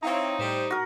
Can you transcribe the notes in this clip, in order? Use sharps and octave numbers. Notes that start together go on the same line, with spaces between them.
C4 D#4 E4 C#5 F5 A#5
A2 G3 G4 C5
F#4 A#4